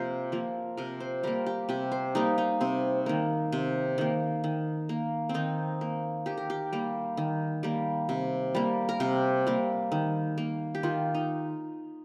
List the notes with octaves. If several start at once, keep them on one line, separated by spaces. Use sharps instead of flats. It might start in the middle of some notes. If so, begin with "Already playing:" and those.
Already playing: C3 F3 A#3 A#4 C5
F3 A#3
C3 A#4
C5
G3 A#3 A#4
G4
C3 G4
C5
G3 A#3 D#4
D#4
C3 C4
D#3 A#3
C3
D#3 A#3
D#3
A#3
C4
D#3 D#4
A#3
D#3 G4
A#4
G4
G3 A#3
D#3
G3 A#3
C3
G3 A#3
A#4
C3 G4
G3 A#3
D#3
A#3
G4
D#3 F4
D#4